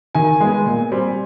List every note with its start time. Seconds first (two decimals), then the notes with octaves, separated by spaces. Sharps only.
0.15 D#3 G#5
0.40 G#3 B3
0.66 A#2
0.92 G3 C4